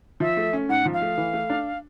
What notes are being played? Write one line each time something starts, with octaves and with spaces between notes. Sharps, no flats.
F3 E5
A3
C#4
G#2 F#5
F3
F5
A3
E3
A3
D4